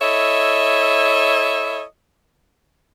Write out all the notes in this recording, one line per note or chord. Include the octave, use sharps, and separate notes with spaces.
E4 A4 C#5 D#5 E5